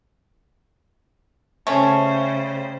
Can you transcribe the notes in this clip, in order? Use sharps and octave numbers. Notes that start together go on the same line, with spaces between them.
C#3 G3 A3 C#4 C5